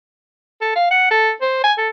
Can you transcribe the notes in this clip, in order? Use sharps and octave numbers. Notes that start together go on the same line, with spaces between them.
A4
F5
F#5
A4
C5
G#5
A4